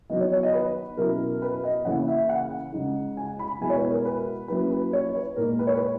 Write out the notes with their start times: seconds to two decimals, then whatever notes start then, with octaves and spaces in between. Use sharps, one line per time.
0.10 D#3 F#3 B3 D#5
0.20 C#5
0.32 C#5
0.43 D#5
0.54 B4
0.97 B2 F#3 C#4 E4 A#4
1.42 B4
1.64 D#5
1.85 C#3 E3 A#3 C#4 E4 F#5
2.08 E5
2.29 F#5
2.73 C#3 G#3 D#4
3.17 G#5
3.39 B5
3.61 B2 G#3 B3 E4 G#5
3.70 C#5
3.76 B4
3.90 A#4
4.05 B4
4.48 F#3 A#3 C#4 E4 B4
4.70 B4
4.93 C#5
5.15 B4
5.36 A#2 G#3 D#4 A#4
5.59 B4
5.67 C#5
5.75 B4